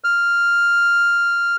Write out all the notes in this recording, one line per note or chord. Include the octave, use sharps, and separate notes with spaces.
F6